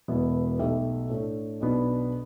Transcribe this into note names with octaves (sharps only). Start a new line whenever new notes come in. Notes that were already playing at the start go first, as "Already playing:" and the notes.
E1 E2 B2 B3 E4
B1 B2 A3 G4 E5
A2 A3 D4
B1 B2 B3 D4